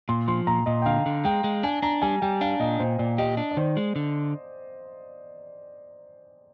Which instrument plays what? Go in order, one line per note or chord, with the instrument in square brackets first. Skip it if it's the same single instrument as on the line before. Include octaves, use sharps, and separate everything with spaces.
[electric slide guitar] A#2 [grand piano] C6
[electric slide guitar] F3 [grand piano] C6
[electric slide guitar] A#2 [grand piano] A#5
[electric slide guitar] A#2 [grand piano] D#5
[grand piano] G5
[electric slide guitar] D3 [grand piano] F5
[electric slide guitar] D3
[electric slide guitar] G#3 [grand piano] G5
[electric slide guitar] G#3
[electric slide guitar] D4 [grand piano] G#5
[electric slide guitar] D4 [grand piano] A#5
[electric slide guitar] G3 [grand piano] G#5
[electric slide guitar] G3 [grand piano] G5
[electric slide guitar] D4 [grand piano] F5
[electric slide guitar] A#2 [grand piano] D#5
[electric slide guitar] A#2 [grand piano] C5
[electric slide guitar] A#2 [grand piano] D5
[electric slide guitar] G4 [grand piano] D#5
[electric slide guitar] D4
[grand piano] D5
[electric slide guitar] D#3 [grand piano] C5
[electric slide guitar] G#3
D3